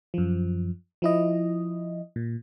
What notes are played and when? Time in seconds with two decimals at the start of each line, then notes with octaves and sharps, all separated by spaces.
0.14 F#2 F3
1.02 F3 E4 D#5
2.16 A#2